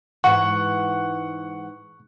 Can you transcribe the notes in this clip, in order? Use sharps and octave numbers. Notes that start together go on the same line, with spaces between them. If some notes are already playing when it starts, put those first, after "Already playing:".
G#2 E3 F#5 C#6